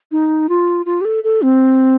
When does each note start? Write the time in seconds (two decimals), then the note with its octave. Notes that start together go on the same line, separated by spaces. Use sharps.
0.12 D#4
0.49 F4
0.86 F4
1.01 G4
1.05 A4
1.24 A4
1.42 C4